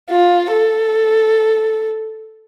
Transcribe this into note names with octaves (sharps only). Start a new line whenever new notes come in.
F4
A4